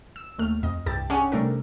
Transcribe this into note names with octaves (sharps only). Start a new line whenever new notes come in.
E6
D#2 A3 F6
F2 D#5
C2 G2 E4 G4 A5 A6
C#4 D4 G4 G#4 C#5 F#5
C3 G3 A3 D4 A4 A#4